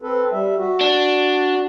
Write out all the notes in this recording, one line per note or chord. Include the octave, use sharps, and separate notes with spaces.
C4 A4 B4
G3 E5
F#4
D4